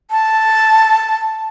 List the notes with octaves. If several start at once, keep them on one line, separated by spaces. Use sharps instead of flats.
A5